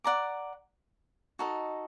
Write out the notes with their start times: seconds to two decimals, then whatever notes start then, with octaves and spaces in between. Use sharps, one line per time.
0.04 D5 F#5 A#5 D6
1.39 D#4 F#4 A4 D#5